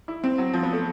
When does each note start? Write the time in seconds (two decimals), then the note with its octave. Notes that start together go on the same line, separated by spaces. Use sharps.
0.08 E4
0.24 C4
0.38 F#3
0.53 F3
0.63 B3
0.73 A3